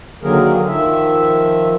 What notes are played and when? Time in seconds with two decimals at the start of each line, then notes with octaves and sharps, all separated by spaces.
0.23 D3 D#3 F#3 A#3 G#4 A#4
0.68 D#3 F3 E5